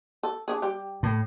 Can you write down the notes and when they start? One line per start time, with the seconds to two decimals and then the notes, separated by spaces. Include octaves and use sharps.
0.23 A4
0.48 D4 E4 G#4
0.62 G3 G4
1.03 A2